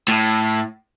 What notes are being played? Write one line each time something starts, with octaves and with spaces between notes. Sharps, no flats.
A2